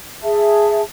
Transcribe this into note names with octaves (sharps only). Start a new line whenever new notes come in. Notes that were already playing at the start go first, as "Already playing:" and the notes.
G#4 E5 A5